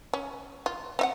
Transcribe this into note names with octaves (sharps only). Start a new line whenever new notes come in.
C#4
F4
C4 E5 F#5